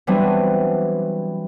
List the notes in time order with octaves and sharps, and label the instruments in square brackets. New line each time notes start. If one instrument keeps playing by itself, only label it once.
[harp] E3 F#3 G3 B3 C4 D4